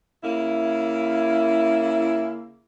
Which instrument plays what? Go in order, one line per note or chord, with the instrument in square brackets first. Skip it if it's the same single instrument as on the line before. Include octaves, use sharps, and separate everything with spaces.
[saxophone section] C#3 A#3 E4